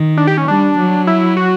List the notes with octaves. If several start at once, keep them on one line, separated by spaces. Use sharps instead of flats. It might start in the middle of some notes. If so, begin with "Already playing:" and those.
Already playing: D#3
D4
G4
C#4
G3 D4
F#3
E4
F#4